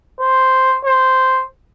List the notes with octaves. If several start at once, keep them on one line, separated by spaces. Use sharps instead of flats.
C5
C5